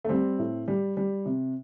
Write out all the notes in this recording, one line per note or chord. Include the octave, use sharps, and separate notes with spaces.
A3
G3 C4
A2
G3
G3
C3